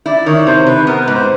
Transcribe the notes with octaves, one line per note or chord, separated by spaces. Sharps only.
E4 D5
D#3 C#5
C3 C5
C3 B4
B3 A#4
B4
G#2
C5